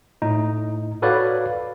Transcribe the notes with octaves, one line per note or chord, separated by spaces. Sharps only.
A2 D#4
F#4 A4 B4 C#5 D5 F5